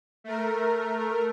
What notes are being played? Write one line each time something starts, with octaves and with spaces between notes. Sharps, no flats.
A3 A#4